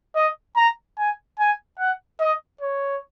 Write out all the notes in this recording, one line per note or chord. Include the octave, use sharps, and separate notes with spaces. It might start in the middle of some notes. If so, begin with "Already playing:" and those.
D#5
A#5
G#5
G#5
F#5
D#5
C#5